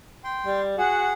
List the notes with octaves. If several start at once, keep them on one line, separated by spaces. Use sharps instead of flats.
G5 C6
G3
F#4 G#4 F#5